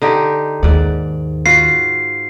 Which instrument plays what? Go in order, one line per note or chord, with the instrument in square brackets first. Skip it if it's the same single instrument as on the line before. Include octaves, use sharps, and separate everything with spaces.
[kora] D3 D#4 G4
[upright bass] D#2 [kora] G#2 D5
[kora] F4 F#4 [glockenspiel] C7